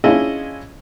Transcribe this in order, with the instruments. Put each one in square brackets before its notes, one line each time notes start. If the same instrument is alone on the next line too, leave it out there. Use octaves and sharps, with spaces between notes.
[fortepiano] C#4 D4 E4 F4 G#4 D#5